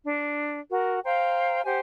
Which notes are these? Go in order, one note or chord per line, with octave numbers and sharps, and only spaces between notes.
D4
F#4 A#4
C5 F5 G5 A#5
G4 C5 F#5 G#5